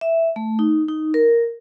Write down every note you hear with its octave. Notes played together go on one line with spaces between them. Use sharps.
E5
A3
D#4
D#4
A#4